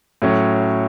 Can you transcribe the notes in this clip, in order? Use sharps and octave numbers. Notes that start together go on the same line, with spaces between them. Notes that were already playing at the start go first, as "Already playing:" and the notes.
A2 F#3 C#4